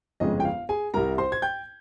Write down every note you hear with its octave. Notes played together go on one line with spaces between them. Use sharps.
G1 F2 C#3 G#3 D#5
G5
F5
G#4 G#5
C2 C3 G3 A#4 A#5
C5 C6
G#6
G5 G6